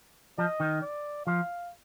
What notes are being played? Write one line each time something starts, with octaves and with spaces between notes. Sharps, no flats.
F3 D#5
D#3
D5
F3 F5